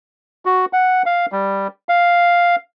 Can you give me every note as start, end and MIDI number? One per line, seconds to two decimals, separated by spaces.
0.45 0.65 66
0.73 1.02 78
1.06 1.26 77
1.32 1.67 55
1.89 2.56 77